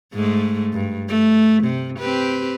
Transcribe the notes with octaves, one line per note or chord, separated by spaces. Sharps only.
G#2 G#3 A3
G2
A3
C3
C4 G4 B4